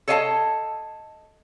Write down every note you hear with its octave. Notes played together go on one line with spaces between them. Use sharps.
A4 C#5 D#5 F5 G5 A5